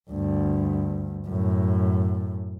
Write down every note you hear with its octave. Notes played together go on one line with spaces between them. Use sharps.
D2 G2
F#2 A2